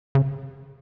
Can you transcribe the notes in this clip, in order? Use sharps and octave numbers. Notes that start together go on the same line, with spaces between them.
C#3